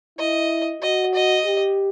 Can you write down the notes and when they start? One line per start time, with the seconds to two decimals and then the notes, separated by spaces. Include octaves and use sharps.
0.19 E4 D#5
0.82 F#4 D#5
1.14 D#5
1.45 G4